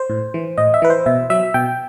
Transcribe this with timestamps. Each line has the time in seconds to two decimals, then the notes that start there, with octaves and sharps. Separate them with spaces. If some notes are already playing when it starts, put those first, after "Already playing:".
Already playing: C5
0.10 A2
0.34 E3
0.58 A2 D#5
0.74 E5
0.82 E3 B4
0.90 C5
1.06 B2 E5
1.30 F#3 E5
1.54 B2 G5